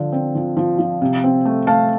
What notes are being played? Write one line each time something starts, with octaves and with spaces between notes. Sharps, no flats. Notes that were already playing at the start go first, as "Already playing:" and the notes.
Already playing: D3 F3
C4
F3
F3
F3
C3
C4
A3
A3 F5 A5